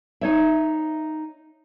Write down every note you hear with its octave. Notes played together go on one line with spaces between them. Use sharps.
D#4 C#5 E5